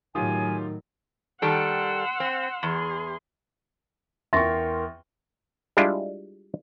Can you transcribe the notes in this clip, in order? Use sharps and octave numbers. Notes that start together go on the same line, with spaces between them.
A2 D#3 F#3 F4 G4 G#5 D#6
D#3 G3 A4 F#5 C6 E6
C4
E2 G#4 C6
E2 A#4 E5 G5 C6 C#6 A6 A#6
G3 G#3 D4 E4 F4